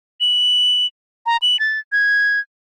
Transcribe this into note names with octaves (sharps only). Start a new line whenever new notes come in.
F#7
A#5
F#7
A6
G#6